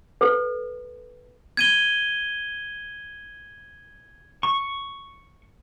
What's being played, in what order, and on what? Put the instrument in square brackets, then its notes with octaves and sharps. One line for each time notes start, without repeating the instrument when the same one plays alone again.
[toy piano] A4 B4
[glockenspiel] G#6 D#7 G7
[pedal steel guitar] C#6